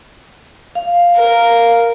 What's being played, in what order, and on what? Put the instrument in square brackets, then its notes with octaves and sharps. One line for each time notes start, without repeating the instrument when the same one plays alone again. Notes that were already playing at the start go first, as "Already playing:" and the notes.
[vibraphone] F5
[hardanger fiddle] A#4